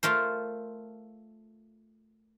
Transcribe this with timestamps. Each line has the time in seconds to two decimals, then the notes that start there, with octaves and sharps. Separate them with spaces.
0.03 A3 F4 A#4 C5